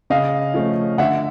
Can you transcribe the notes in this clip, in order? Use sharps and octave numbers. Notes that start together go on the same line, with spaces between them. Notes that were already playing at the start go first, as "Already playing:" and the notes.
C#3 D#5 F5
F3 A3 C#4
D3 E5 F#5